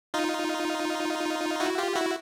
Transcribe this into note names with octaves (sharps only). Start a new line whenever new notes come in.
D#4 F4
E4 F#4
F4 G4
E4 F#4